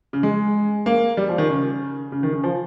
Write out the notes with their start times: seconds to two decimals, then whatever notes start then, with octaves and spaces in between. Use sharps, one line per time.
0.13 C#3
0.23 G#3
0.86 A#3
1.17 G3
1.29 F3
1.38 D#3
1.50 C#3
2.12 C#3
2.23 D#3
2.33 C#3
2.43 F3